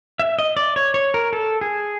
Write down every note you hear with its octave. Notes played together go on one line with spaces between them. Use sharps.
E5
D#5
D5
C#5
C#5
A#4
A4
G#4